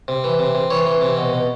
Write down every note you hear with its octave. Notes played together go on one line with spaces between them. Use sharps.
C3
E3
C3
C3
E3 C#5
E3
C3
B2
B2